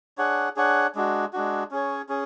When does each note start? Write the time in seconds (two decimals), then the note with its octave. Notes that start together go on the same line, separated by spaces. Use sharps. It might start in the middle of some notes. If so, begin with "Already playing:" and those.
0.18 D4 G#4 C#5 F#5
0.56 D4 G#4 C#5 F#5
0.95 G#3 D4 F#4
1.33 G#3 D4 F#4
1.71 C#4 G#4 C#5
2.09 C#4 G#4